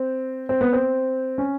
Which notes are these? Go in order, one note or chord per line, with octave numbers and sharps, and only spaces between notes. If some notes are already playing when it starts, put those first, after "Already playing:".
Already playing: C4
C4
B3
C4
C#4